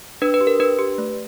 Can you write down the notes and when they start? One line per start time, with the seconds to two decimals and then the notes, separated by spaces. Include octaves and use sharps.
0.22 D4 B4
0.34 B4
0.41 G4
0.47 A#4
0.60 D4 B4
0.79 G4
0.98 A3